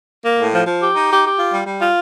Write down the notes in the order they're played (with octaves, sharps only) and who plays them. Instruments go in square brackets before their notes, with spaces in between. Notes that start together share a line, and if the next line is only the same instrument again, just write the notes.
[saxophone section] A#3
A2
F3
F3
G4
D#4
G4
G4
F4
G3
G3
F4